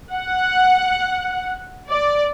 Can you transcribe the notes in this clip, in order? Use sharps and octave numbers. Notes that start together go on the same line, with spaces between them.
F#5
D5